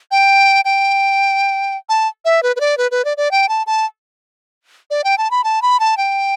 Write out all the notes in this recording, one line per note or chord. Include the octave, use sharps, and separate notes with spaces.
G5
G5
A5
E5
B4
B4
D5
B4
B4
D5
D5
G5
A5
A5
D5
G5
A5
B5
A5
B5
A5
G5